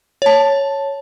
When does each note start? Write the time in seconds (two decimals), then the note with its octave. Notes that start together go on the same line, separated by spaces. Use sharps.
0.22 C#5 A5